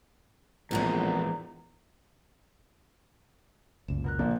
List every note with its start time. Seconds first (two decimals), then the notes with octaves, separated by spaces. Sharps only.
0.71 A#1 E2 A2 G#3 B3 C4 A#5
3.88 F#1 C#2 A#2 E7
4.04 B2 A#4 F#6
4.19 A#1 A#3 D4